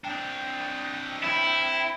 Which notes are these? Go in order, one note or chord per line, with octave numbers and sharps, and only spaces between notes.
C4 D4 G5
E4